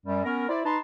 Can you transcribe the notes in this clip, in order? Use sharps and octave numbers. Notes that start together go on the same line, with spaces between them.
F#2 G3
B3 C#4 A#4
E4 C5 D5
D#4 B4 A5 C6